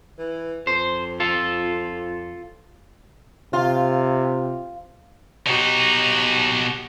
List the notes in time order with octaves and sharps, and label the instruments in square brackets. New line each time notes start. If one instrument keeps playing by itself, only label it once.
[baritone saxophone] E3
[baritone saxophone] F2 [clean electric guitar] C5
[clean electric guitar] F4 A4
[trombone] C3 [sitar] F4
[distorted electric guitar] B2 D#4 [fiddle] F#4 G4